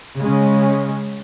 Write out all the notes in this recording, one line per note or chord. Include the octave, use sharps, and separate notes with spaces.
C#3 G#3 C#4